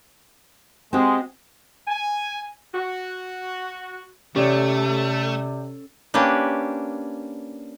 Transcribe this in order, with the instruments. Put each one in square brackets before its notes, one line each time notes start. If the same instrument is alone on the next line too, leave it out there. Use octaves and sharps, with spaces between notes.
[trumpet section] G#3 [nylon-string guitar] C4 F#4 G4
[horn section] G#5
F#4
[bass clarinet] C3 [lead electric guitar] A3 [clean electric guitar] C#4 A4 C#5 [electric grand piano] G4 D5
[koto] A#3 C#4 D4 G4 B4